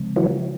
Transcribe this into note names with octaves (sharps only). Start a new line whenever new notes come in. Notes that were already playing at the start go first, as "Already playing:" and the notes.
Already playing: C#3 F3 G#3 C4
E3 F#3